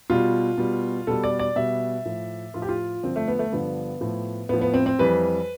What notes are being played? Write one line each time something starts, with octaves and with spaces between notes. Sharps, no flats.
B2 G3 F4
B2 G3
B2 G3 A4
D5
D5
B2 G3 E5
A2 F3
A2 F3 F4
G4
F4
G2 D3 F3 C4
A3
B3
A3
G2 D3 F3 B3
A2 F3
A2 F3 B3
B3
C4
C4
F2 E3 G3 B4